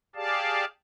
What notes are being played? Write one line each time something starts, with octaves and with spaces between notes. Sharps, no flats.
G4 G#4 D5 F5 A5